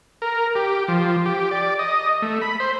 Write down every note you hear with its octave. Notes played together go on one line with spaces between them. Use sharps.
A#4
G4
F3
G4
D5
D#5
A3
B5
C5